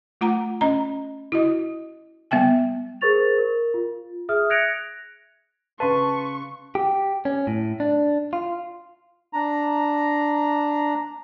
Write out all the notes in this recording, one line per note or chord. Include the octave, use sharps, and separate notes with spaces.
A3 F4 F#5 A#5
C#4 D#5 A#5
E4 F#4 D#5
G3 B3 E5 G5 G#5
G#4 A#4 C5 C#6 A6 F7
A#4
F4
G#4 E5 D#6 F6
F#6 G#6 A#6 C#7 D7 F7
C#3 B4 F5 A5 C6 C#6 D#7
G4
C#4
A2
D4
F4
D4 A#5